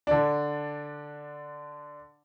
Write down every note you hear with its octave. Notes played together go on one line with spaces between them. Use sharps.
D3 D4